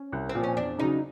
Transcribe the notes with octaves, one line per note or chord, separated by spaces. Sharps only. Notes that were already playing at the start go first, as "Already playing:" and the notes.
Already playing: C#4
C2
C4
A#2 F3
C#4
E2 D4
C#3 F#3 D#4